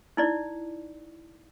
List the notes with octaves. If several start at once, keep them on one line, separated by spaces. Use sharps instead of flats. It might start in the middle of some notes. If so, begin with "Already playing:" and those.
D#4 E4 D5